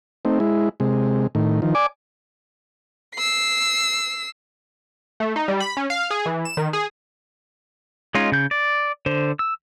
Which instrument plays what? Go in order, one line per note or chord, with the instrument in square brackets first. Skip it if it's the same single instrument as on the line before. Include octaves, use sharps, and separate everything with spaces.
[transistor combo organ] A3 C4 D#4
G#3 E4
C3 G#3
A2 D#3
D#3 F3
D5 G#5 D6
[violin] E6 C7
[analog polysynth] A3
D#4
G3
B5
C#4
F5
G#4
E3
E7
D#3
G#4
[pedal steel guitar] G#3 C#4 D#4 F4
C#3 G6
D5
D3 C5
E6